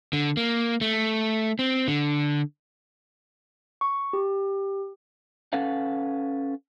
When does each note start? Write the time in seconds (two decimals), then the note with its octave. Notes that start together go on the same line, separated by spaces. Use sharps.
0.13 D3
0.37 A#3
0.81 A3
1.59 C4
1.88 D3
3.81 C#6
4.13 G4
5.53 C#4 A4 B4 F5 F#5